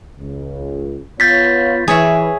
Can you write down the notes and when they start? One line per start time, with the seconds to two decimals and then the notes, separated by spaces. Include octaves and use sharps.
0.20 C#2
1.20 B3 F4 C#5 G6 A6 B6
1.88 E3 G#4 C#5 E5